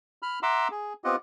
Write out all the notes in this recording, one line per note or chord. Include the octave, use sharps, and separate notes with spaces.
B5 F6
E5 F#5 A#5 C6 D6 E6
G#4
B3 C4 F4 G4 D#5 F#5